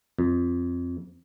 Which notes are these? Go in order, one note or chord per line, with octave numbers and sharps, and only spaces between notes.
F2